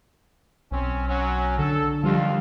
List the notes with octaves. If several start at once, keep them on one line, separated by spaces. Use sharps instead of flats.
B1 C4 C#4
F#3 C#4
D3 A4
D#2 F3 G3 F4